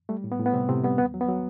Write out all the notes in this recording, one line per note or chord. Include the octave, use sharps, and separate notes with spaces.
G3 A3
A2
B3
A2
B3
C3 G3 C4
A2 C3 C4
G3 B3
D#2 B3
F#3
B3
F#3